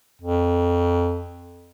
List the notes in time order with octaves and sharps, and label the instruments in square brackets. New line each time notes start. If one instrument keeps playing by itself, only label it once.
[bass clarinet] F2